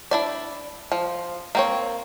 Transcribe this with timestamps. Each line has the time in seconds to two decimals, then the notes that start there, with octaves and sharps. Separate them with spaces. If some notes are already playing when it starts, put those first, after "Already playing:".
0.11 D4 E4 D5
0.92 F3
1.55 A#3 C4 C#5